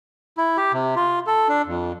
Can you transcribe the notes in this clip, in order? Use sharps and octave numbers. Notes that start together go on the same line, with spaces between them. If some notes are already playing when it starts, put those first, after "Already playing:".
E4
G4
C3
F4
A4
D4
F2